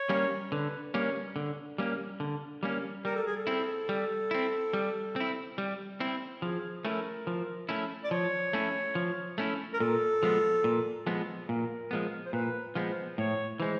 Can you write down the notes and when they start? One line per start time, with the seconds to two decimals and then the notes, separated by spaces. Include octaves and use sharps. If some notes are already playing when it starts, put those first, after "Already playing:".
Already playing: C#5
0.09 G3 A#3 C#4
0.51 D3 B4
0.93 G3 A#3 C#4 C#5
1.36 D3
1.78 G3 A#3 C#4
2.20 D3
2.63 G3 A#3 C#4
3.05 G3 A#4
3.15 A4
3.26 G#4
3.36 A4
3.47 C4 E4
3.89 G3
4.31 C4 E4
4.73 G3
5.16 C4 E4
5.58 G3
6.00 C4 E4
6.42 F3 G#4
6.85 A3 C#4 E4 A#4
7.27 F3
7.69 A3 C#4 E4
8.04 D5
8.11 F3 C#5
8.53 A3 C#4 E4
8.95 F3
9.38 A3 C#4 E4
9.73 A#4
9.80 A#2 A4
10.23 F3 G#3 B3
10.64 A#2
11.07 F3 G#3 B3
11.49 A#2 A#4
11.91 F3 G#3 B3
12.26 C5
12.33 A#2 B4
12.75 F3 G#3 B3 C5
13.18 A2 C#5
13.60 E3 G#3 C5